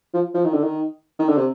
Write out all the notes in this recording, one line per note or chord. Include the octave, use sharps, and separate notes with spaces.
F3
F3
D#3
D3
D#3
D#3
D3
C3